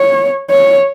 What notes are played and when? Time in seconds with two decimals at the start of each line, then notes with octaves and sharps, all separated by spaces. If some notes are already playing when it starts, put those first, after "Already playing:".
Already playing: C#5
0.51 C#5